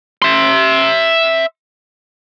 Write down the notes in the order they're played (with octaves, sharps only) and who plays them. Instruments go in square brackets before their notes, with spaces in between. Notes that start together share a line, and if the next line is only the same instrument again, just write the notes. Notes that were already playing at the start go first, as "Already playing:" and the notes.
[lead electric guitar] E5 C6